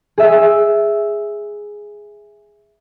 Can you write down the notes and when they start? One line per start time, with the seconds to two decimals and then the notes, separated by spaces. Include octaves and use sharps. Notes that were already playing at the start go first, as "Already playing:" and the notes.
0.18 G#4 E5